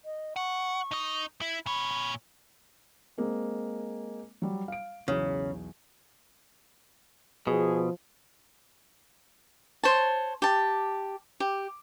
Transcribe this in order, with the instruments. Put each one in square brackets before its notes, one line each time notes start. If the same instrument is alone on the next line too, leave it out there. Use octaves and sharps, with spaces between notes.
[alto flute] D#5
[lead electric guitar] F#5 [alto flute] C#6
[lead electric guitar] D#4 D#5
E4
[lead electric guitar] A#2 C#5 [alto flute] B5
[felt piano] G#3 A#3 C4
F#3 G3
F5 D7
[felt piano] B1 E2 [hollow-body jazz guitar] C#3
[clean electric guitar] B2 [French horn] F3 [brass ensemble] G#4
[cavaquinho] C5 C#5 A5
G4 A5
G4